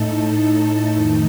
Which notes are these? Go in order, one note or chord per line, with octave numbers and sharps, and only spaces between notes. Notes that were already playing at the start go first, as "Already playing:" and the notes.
Already playing: A2 A3 D#4 A4
F2 D#3 A3 D#4